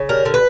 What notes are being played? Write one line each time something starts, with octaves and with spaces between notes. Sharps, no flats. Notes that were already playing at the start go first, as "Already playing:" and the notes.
Already playing: C#3
G3 A#4
D3
B4